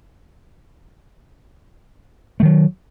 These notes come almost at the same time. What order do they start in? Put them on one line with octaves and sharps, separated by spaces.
A3 D#3 F#3